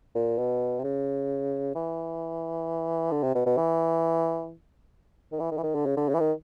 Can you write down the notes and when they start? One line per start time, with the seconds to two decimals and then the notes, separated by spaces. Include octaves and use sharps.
0.15 A#2
0.38 B2
0.79 C3
0.84 C#3
1.75 E3
3.12 D3
3.23 C3
3.35 B2
3.46 B2
3.57 E3
5.32 D#3
5.40 E3
5.51 D#3
5.57 E3
5.63 D#3
5.75 D3
5.86 C#3
5.97 D3
6.09 C#3
6.14 E3
6.20 D#3